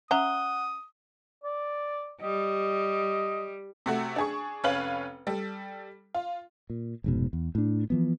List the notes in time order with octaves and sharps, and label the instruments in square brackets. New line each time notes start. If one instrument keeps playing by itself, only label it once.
[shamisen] C#4 E5 A#5 [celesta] F#5 F#6 G7 [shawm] D#6
[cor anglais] D5
[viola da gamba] G3 [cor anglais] D#5
[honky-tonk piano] C3 A3 F#4
D4 G#4 C#6
F1 C#4 B4 C#5 F5 F#7
G3 A4
F4
[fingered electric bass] A#2
F1 G#2 B2
E2
A2 D4
E3 F3 B3